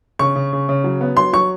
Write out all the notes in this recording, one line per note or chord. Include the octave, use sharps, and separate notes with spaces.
C#3 C#6
C#3
C#3
C#3
F#3
B3
F#3 C6
F#3 C#6